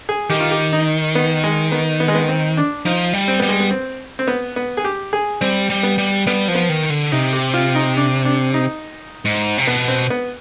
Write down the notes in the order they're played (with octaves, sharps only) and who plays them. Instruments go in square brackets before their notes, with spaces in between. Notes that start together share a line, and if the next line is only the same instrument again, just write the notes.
[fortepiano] G#4
[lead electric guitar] D#3 [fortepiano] G4
[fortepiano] F4
G4
D#4
B3
G#3
B3
B3
G#3
B3
C4
D4
[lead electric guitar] F3 [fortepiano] D#4
[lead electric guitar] G3
[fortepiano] C4
[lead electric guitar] G3 [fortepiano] B3
[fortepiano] G#3
B3
C4
C4
B3
B3
G#4
G4
G#4
[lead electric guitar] G3 [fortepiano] C4
[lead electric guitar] G3
[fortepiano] B3
[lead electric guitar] G3
[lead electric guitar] G3 [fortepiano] B3
[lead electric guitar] F3
[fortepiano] B3
[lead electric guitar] D#3
D3
[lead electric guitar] C3 [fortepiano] D#4
[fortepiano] G4
F4
D#4
D4
D4
D#4
[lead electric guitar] G#2
C3
[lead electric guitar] B2 [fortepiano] B3
[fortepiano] C4
B3